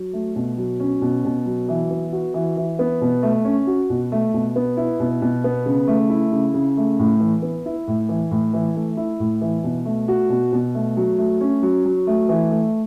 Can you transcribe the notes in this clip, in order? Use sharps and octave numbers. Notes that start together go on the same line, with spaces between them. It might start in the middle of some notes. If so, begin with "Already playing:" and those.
Already playing: F#3
A3
B2
F#3
C#4
B2
B2
F#3
E3
B3
F#4
E3
E3
B3
B2
A3
C#4
F#4
B2
A3
B2
B3
E4
B2
B2
B3
C#3
A3
E4
C#3
C#3
A3
A2
E3
B3
E4
A2
E3
A2
E3
A3
E4
A2
E3
B2
A3
F#4
B2
B2
A3
F#3
A3
C#4
F#3
F#3
A3
E3
A3